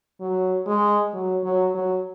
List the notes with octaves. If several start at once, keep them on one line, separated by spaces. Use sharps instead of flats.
F#3
G#3
F#3
F#3
F#3